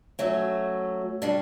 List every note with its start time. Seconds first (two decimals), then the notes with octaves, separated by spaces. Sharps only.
0.19 F#3 A3 C#4 F#4
1.22 C#3 G3 D4